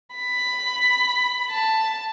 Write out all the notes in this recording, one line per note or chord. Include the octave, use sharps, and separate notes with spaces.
B5
A5